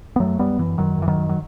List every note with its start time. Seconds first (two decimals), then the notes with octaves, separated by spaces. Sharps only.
0.16 B3
0.20 F#2 F#3 A3
0.39 F#2 G3 B3
0.59 F#2 E3
0.78 F#2 D#3 F#3
0.98 F#2 E3
1.08 D#3 F#3
1.18 F#2
1.29 F#3